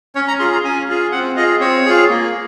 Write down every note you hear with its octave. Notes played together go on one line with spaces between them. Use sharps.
C#4 C#5
A#5
F4 G#4 C6
A#5
C#4 G#5
F4 G#4
C4 F#5
F4 G#4 D#5
C4 C#5
F4 G#4
A#3